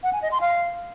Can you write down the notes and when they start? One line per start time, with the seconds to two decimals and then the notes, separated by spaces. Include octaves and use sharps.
0.03 F#5
0.13 G#5
0.22 D#5
0.32 C6
0.41 F5